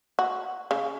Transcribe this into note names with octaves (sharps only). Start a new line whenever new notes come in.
F#4
C#3